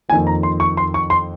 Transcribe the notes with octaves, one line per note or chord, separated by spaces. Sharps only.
F2 D#3 A#3 G#5
A#5
C6
C#6
C6
C#6
C6